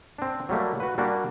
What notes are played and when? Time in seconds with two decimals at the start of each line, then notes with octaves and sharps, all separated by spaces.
0.18 C4 D4
0.49 F#3 G3 A3 A#3
0.80 F#4 B4
0.98 G3 A#3 D4 F#4